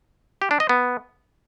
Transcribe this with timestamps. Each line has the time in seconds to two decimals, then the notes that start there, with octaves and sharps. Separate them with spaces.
0.42 G4
0.51 D4
0.60 D#5
0.69 B3